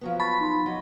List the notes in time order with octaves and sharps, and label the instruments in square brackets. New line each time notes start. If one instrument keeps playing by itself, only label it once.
[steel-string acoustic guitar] F3 F#3 B3
[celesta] A5 C#6 A6 [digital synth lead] B5
[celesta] D#4 C6
[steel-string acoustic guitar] F#3 D#5